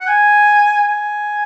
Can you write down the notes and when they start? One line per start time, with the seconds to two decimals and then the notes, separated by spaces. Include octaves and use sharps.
0.01 F#5
0.07 G#5
0.87 G#5